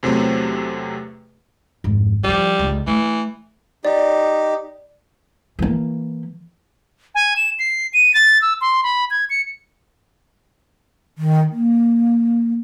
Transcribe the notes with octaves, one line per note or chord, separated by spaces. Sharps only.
E2 C3 F#3 A3 C4
G#1 F2
E3 F3 G3
C#2 D#4
E3 A3
D#4 G4 D5
E3 A#3
G#5
E7
C7
D#7
A6
E6
C6
B5
G#6
C#7
D#3
A#3